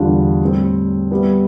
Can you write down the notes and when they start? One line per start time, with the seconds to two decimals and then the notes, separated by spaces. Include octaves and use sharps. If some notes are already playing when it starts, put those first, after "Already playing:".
Already playing: E2 D3 G3 D4 F4
0.41 A2 G3 C4
1.11 G3 B3 E4 B4